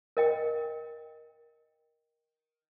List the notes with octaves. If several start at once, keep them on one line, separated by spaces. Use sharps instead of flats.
A#4 D#5 G5